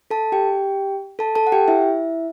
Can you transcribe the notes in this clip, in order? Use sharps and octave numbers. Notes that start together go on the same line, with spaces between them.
A4 A5
G4 G5
A4 A5
A4 A5
F#5
G4 G5
E4 E5